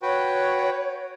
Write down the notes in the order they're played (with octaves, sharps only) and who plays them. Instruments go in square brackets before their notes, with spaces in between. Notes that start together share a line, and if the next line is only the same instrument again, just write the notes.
[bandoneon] F#4 B4 G5 [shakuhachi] C#5